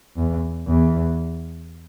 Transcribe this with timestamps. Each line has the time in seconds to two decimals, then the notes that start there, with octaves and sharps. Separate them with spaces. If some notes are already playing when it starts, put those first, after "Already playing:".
0.17 E2
0.68 E2